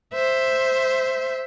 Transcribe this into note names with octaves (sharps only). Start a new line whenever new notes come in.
C5 E5